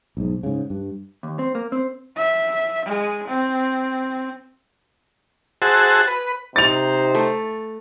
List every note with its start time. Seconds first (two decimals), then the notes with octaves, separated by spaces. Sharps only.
0.17 B1 G#2
0.43 G#2 C#3
0.70 G2
1.23 D#2
1.39 C4
1.55 A#3
1.72 C4
2.16 E5
2.86 G#3
3.28 C4
5.62 F#4 G#4 C5 E5 F#5 A5
6.08 B4
6.56 C3 D#4 C5 A6 F7
7.15 A3